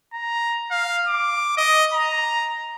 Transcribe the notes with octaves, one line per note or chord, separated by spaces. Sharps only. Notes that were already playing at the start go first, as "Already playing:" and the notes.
A#5
F5
D6
D#5
A#5